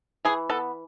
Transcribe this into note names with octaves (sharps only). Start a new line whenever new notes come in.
E3 G#4
B3 A4